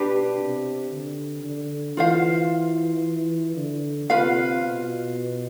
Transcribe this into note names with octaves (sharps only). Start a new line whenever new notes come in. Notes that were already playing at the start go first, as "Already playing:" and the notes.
Already playing: B2 D4 G4 B4
C3
D3
D3
E3 F4 C5 F5
D3
C3 F4 B4 F5
B2